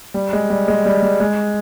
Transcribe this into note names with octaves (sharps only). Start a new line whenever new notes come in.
G3
G#3
G3
G#3
G3
G3
G#3